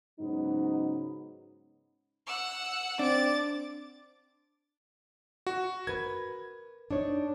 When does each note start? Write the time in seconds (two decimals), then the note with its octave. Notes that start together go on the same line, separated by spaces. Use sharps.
0.19 G#2 C#3 F#3 B3 D#4
2.27 F#5 E6
2.99 C4 D4 D6 A6
5.47 F#4
5.87 A#4 B4 G#6
6.91 D4 D#4 C#5